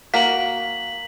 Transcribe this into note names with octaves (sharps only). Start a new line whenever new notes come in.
A#3 F#4 B6 F#7